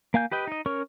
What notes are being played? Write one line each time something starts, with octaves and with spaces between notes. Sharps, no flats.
A#3 F5 G#5 G6
G4 B4 D#5 G5
D#4 D#5
C#4 A#4 C#5 C#6 F6